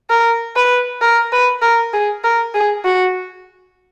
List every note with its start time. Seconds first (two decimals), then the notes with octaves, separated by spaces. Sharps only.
0.10 A#4
0.56 B4
1.02 A#4
1.32 B4
1.62 A#4
1.93 G#4
2.24 A#4
2.55 G#4
2.85 F#4